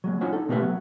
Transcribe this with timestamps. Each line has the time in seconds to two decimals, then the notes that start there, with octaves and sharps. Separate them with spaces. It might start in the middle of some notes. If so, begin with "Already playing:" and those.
0.04 F#3 G#3 A#3
0.21 C#4 D#4 F4 F#4 C#5 F#5
0.33 D#4 A4
0.49 B2 A3 A#3 G4 B4 E5
0.61 F#3 B3